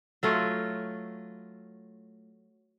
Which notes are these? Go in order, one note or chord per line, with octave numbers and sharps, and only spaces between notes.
F#3 A3 F4 C#5